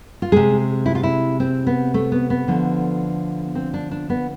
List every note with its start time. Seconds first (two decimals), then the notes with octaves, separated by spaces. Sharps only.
0.22 F4
0.32 C3 G#3 G#4
0.86 E4
0.95 F4
1.03 E4
1.40 C4
1.67 B3
1.94 A3
2.12 B3
2.30 B3
2.48 D3 F3 A3
3.55 C4
3.74 D4
3.91 D4
4.10 B3